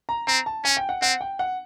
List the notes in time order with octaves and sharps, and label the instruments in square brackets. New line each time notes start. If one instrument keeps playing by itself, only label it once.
[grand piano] A#5
[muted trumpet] C4 [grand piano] A#5
[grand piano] A5
[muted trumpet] C#4 [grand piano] G#5
[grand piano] G5
F#5
[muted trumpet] C4 [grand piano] F#5
[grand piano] G5
F#5